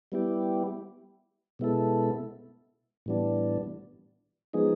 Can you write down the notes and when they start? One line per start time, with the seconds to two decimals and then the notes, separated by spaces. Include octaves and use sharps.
0.12 G3 B3 E4 G4
1.59 B2 G#3 B3 E4 A4
3.06 A2 E3 G3 B3 D4
4.53 F3 G#3 B3 D#4 G#4